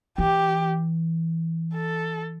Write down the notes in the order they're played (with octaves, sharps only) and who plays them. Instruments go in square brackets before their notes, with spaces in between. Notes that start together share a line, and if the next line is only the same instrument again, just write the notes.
[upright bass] E3 [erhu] G4
[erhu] A4